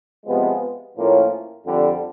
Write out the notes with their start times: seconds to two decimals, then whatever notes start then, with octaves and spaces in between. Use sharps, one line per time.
0.26 C3 F3 G#3 B3
0.96 A2 F3 A#3 C#4 F4
1.65 F2 D3 G3